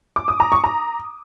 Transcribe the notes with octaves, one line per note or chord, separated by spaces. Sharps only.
D6
D#6
A#5
C#6
A#5